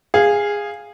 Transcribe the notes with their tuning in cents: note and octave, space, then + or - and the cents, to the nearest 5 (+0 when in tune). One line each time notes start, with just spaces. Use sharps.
G#4 -15 F5 +0